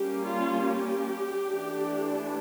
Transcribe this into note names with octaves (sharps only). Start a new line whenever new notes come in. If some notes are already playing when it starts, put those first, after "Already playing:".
Already playing: G3 A#3 C#4 G4
F4
G4
E3 A3 D4